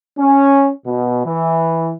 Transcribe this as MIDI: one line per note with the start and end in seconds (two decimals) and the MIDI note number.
0.18 0.71 61
0.86 1.23 47
1.26 1.93 52